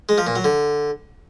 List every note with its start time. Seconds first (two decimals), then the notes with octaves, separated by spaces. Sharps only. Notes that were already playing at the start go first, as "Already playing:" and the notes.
0.09 G#3
0.18 F3
0.27 A#2
0.36 F#3
0.44 D3